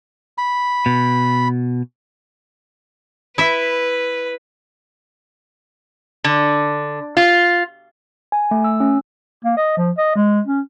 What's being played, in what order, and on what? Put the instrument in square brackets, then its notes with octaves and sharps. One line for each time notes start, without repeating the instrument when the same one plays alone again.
[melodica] B5
[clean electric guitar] B2
[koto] E4 E5 [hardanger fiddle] B4
[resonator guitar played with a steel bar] D3
F4
[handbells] G#5
A3
E6
C#4
[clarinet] A#3
D#5
F3
D#5
G#3
C#4